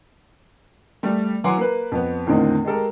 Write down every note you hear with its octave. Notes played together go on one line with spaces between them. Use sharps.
G3 A3
E3 F#3 F#5 G#5 C6 D6
A#3 B4
F2 B3
E2 A2 D3 D#3 C4 D#4
G#3 G4 A4 A#4